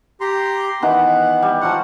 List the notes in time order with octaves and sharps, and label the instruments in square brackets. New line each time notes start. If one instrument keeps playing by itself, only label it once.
[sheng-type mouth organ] G4 A#5 C6
[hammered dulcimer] D#3 E3 F#5 [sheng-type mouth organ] B3
[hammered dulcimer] G3
[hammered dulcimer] F3 F#3 F#4 [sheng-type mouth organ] F#5